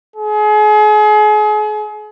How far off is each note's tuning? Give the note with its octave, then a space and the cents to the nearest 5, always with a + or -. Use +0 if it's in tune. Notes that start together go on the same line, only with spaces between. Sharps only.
G#4 +35